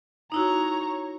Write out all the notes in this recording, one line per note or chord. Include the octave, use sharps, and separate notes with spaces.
D#4 E4 F#4 C#5 A#5